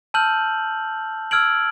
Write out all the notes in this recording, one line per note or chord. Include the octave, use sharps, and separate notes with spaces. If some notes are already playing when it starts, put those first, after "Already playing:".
A5 E6 F6 G6 F#7
E6 F6 G#6 D7 F#7